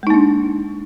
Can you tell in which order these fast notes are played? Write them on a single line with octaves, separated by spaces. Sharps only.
G#3 D#4 A#3 D4